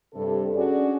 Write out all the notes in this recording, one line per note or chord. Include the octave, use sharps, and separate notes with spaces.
G2 C3 A4
C#4 D4 F#4 G#4 D5